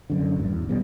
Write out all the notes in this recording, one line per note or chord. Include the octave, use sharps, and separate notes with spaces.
F#2 D3
G#1 D2 G2
E2
A1 B2 G3